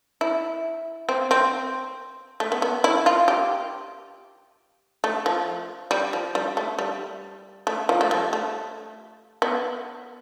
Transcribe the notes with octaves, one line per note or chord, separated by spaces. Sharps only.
E4
C4
C4
A3
B3
B3
E4
F4
G4
A3
F3
G3
F3
G3
A3
G3
A3
F3
A3
G3
A3
B3